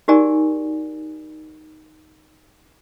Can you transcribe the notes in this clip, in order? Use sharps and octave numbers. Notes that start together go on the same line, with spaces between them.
D#4 F#4 G4 A#4 D5 G#5